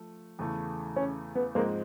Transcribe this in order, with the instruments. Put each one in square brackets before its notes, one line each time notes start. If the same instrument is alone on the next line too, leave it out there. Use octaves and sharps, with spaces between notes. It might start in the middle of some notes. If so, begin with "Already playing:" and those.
Already playing: [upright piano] F3 A3
E2 C#3 E3 A3
[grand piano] C#4
B3
[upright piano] G#2 F3 G#3 C4 [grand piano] A#3